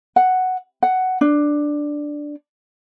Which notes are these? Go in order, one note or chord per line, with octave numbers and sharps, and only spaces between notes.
F#5
F#5
D4